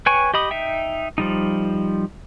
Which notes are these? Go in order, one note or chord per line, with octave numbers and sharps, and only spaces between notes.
B4 C#5 G5 G#5 C#6
G4 D#5 B5 D#6
D#4 E5 G5
F3 G3 D#4